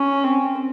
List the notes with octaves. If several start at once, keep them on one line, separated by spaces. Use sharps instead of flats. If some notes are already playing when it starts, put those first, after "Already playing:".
Already playing: C#4
C4